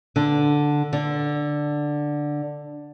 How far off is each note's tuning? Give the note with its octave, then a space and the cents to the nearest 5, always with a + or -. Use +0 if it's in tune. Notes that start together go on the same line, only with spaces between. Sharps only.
D3 +0
D3 +5